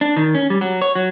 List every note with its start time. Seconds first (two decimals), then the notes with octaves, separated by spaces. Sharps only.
0.01 D4
0.16 D#3
0.35 C#4
0.50 G3
0.61 F#3
0.82 C#5
0.95 F#3